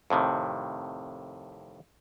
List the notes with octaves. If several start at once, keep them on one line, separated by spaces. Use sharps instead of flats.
F2 A2 C3 D#3